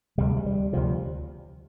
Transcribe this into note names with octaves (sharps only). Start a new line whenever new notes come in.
D2 C3 G3
G#3
G3
D2 C3 F3